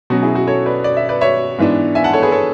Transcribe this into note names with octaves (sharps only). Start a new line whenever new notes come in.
B2 F#3 C#4 F#4
E4 G#4
F#4
A4 C#5
B4 D5
D5
E5
B4 D5
C#5 E5
G#2 E3 B3 D4
E5 G#5
F#5 A5
A4 C#5
G#4 B4
A4 C#5